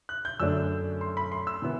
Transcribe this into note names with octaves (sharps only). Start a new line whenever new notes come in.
F#6
G6
F#2 D3 A3 D4 E6
C6
B5
C6
E6
A2 E3 B3